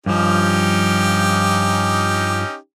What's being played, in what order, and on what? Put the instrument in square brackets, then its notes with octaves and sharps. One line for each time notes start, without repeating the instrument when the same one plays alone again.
[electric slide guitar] G2 F3 [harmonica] C#4 D#4 G4